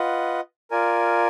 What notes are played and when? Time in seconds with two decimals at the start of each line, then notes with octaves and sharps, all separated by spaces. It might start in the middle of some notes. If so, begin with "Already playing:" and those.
Already playing: F4 B4 D#5 F#5
0.71 F4 A#4 D5 G#5